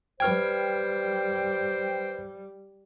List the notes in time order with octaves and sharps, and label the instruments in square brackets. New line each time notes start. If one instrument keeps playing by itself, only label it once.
[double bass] G3 [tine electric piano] B4 F6 G#6 [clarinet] C5 [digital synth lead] G5